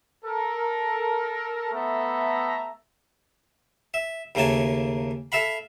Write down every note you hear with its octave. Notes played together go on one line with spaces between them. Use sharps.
A4 A#4
A3 B3 A4 E5 A#5
E5
D#2 C#3 A3 A#3 G#5 A5
A4 E5 F5 B5